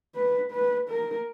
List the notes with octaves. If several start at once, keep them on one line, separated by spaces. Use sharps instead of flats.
B4
B4
A#4